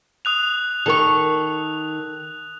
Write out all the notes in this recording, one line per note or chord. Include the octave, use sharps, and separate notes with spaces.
D#6 F#6 F7
D#3 A4 A#4 C#6